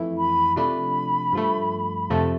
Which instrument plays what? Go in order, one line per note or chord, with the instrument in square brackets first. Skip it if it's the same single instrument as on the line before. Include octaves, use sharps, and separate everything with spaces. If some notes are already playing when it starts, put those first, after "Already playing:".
Already playing: [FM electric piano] F2 E3 A3 E4
[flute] B5
[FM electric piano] C3 F3 A3 D4 [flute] B5
[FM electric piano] G2 F3 A3
[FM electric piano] F2 C3 F3 A3 [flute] A5